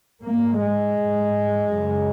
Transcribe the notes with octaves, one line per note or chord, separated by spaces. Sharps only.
G#2 A#3
G#3
G#2
F#2 C#3